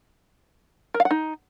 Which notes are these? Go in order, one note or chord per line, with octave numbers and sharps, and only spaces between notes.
A#4
F5
F#5
D#4